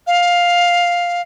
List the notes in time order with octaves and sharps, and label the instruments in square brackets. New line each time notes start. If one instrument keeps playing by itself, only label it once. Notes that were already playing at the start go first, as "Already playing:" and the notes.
[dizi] F5